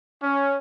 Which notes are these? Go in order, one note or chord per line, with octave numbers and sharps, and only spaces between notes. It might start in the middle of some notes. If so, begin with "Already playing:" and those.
C#4